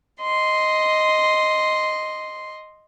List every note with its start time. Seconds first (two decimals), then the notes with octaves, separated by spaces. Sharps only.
0.22 D#5 C6